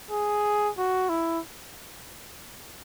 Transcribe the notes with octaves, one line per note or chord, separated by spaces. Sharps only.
G#4
F#4
E4